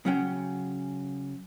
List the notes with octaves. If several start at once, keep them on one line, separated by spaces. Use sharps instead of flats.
C#3 F#3 C#4 F#5 G5